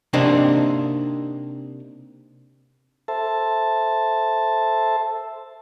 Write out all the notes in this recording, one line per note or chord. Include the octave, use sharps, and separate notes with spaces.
C3 A#3 C4 D4 D#4
A4 C5 E5 A5